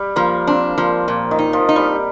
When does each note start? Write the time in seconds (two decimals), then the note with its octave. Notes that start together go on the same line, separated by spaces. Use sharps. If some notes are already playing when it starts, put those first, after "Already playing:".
Already playing: G3
0.16 F3 A#3
0.47 C4 D4
0.78 F3 A#3
1.08 A#2
1.31 D#3
1.39 D#4
1.53 F3
1.69 D#4
1.76 G3